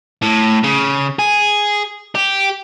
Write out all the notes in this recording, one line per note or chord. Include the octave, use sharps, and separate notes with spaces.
A2
C#3
G#4
G4